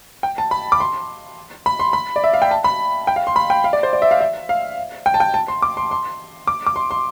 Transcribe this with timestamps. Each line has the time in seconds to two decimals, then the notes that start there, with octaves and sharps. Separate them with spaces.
0.23 G5
0.38 A5
0.51 B5
0.72 D6
0.80 C6
1.66 B5
1.79 C6
1.93 B5
2.16 D5
2.24 E5
2.34 F5
2.42 G5
2.51 A5
2.64 B5
3.07 G5
3.16 F5
3.27 C6
3.36 B5
3.50 G5
3.64 F5
3.73 D5
3.83 C5
3.93 D5
4.02 E5
4.11 F5
4.21 E5
4.49 F5
5.06 G5
5.14 A5
5.20 G5
5.34 A5
5.48 C6
5.62 D6
5.77 C6
5.91 C6
6.47 D6
6.66 D6
6.76 C6
6.91 C6